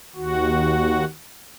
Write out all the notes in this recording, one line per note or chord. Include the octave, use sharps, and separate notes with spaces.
D#2 F#4